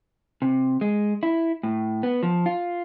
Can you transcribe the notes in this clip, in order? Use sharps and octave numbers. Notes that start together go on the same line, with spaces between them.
C3
G#3
E4
A2
B3
F3
F4